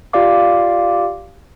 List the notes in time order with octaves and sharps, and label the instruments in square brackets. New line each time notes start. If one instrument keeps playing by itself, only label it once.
[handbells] F4 G4 D5 F5 D6